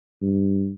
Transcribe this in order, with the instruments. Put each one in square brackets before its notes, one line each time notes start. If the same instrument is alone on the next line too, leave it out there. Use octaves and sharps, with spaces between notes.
[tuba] G2